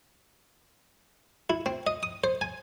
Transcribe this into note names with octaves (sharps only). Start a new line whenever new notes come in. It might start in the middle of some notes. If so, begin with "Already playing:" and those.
E4
C4
D#5
D#6
C5
G#5